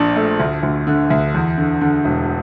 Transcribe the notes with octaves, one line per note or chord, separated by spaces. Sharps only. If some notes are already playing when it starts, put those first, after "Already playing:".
Already playing: A#1 A#2 D4
A3
D2
D2
D3
D2
E2
D3
D3
E1